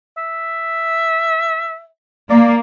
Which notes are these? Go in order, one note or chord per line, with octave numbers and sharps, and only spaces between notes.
E5
A#3 D5